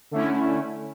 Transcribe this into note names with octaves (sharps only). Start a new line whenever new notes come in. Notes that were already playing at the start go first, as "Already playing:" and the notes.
D3 A3 C#4 E4